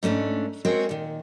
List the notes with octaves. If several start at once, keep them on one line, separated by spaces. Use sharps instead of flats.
G#2 A3 C#4 D4
G#3 C4 F#4 G#4 A#4 C#5
A#2 D#3